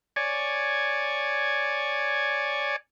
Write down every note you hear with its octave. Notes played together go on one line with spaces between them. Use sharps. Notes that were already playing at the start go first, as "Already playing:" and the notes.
C#5 D5 G#5